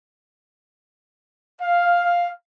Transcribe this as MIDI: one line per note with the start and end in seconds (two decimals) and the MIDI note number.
1.61 2.31 77